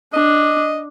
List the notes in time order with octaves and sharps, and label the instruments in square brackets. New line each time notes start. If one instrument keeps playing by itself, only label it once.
[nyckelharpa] D4 [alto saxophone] D#5